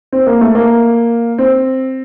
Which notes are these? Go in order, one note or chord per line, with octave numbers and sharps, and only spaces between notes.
C4
A#3
A3
A#3
C4